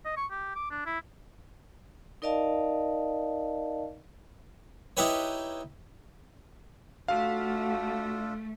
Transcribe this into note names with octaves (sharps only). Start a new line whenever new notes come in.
D#5
C#6
G4
D6
D4
E4
D#4 A#4 D5 D#5 F5 A5
D#4 E4 G4 B4 C#5
A3 D4 F4 F#4 A4 F5